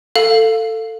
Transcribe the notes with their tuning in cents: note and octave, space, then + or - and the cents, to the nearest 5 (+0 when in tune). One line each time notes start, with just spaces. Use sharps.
A4 +15 F5 +0